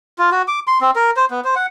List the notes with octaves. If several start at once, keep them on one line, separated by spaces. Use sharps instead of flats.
F4
F#4
D6
C6
C4
A#4
C5
B3
C5
F#5